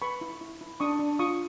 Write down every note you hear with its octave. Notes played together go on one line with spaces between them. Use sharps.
B4 B5 C#6
E4
E4
E4
D4 C#6 D#6
D4
F4 C#6 D#6